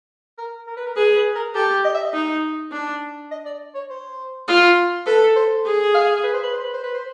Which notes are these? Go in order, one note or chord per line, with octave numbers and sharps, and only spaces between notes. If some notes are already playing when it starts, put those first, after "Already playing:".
A#4
A#4
B4
A#4
G#4 B4
B4
A#4
G4 A4
D#5
E5
D#5
D#4
D4
D#5
D5
C#5
C5
F4
A4 B4
C5
G#4
F5
B4
C5
B4
C5
B4
C5
B4
C5